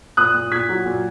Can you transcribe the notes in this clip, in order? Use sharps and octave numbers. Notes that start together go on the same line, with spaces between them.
A#2 D#6 F#6
A#2
A#2 G#6 B6
F#3
A#2